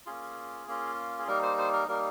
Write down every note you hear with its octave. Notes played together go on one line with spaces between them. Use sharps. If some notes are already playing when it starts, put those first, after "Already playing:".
A#3 C#4 F4 G#4
A#3 C#4 F4
G#4
G3 A#3 D#4 A#4
C5
C5
A#4
G3 A#3 D#4 A#4